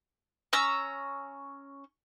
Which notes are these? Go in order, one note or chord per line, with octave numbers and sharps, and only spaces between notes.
C#4 A#5 E6